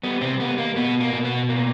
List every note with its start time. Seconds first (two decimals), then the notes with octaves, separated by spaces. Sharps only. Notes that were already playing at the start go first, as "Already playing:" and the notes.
0.03 G3 B3
0.21 C3 C4
0.40 A#3 B3
0.58 A#3
0.76 B2 B3
1.01 A#3
1.13 B2
1.25 B3
1.49 A#3